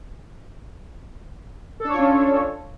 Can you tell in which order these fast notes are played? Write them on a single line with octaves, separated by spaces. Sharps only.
A4 D4 C#5 F4 C#4